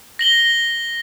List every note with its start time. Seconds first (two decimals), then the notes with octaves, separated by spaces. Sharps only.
0.19 A#6 F#7 G7